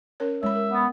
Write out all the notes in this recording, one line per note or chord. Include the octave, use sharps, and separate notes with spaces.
C#4 A#4 C#5
G#3 E4 C#5 E5 B5
A#4
B3